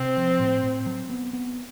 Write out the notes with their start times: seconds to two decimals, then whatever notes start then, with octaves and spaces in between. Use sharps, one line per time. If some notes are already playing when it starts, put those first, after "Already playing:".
Already playing: C3 C4
0.17 F3
0.40 A2
0.64 A2
0.86 F#3
1.10 B3
1.33 B3